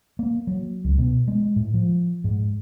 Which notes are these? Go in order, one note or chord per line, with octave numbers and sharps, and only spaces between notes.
A#3
F#3
C#2
B2
G#3
A2
F3
G#2